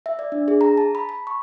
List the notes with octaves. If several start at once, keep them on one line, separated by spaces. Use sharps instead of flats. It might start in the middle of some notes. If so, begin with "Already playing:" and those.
E5
D5
D4
G#4
A#5
A5
B5
B5
C#6